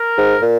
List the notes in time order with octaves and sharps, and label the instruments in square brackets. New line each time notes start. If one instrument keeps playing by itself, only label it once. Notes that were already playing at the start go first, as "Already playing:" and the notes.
Already playing: [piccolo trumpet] A#4
[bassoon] G#2
A#2